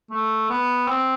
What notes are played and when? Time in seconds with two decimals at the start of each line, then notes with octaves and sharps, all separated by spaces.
0.11 A3
0.50 B3
0.88 C4